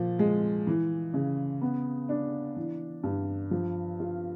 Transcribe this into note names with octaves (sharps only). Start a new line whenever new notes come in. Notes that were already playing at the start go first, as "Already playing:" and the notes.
Already playing: A#2 F3
G#3
E3
C#3
B3
D4
E3
G2
F3
F4